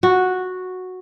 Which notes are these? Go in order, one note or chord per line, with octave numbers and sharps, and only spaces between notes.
F#4